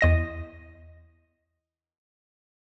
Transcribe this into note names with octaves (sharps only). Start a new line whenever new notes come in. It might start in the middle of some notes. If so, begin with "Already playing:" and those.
E2 D#5 A#6